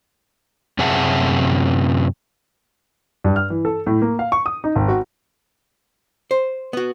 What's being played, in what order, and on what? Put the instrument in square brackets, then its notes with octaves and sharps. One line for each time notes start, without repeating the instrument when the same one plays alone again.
[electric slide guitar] F#2 C3 G#4 E5 F#5 A5
[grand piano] G2
F6
E3
A4
A2
A#3
F5
C#6
D#6
D#4
G#1
F#4
[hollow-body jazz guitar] C5
B3 F#4